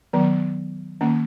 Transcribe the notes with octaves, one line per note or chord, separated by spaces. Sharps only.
D#3 F#3 B3
D#3 A#3 C#4